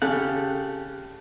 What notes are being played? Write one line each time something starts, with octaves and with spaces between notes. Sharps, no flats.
C#3 G4 A4 F#5